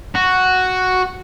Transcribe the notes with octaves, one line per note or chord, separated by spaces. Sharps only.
F#4